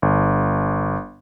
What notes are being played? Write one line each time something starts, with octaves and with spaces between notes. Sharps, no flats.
G1